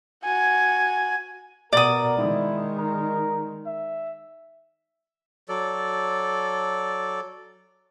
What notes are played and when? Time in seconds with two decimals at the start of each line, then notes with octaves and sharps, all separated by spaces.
0.24 F#4 G#5
1.73 B2 A#4 D5 D#6
2.18 D#3 G#3 E4
2.79 A#4
3.66 E5
5.49 F#3 A4 D5